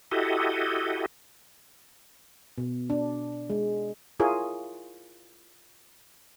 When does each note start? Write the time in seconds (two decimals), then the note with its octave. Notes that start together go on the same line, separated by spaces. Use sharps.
0.12 E4 F#4 G4 A4 D#5
2.58 B2
2.90 D4
3.50 G#3
4.20 E4 F4 G#4 A#4 C#5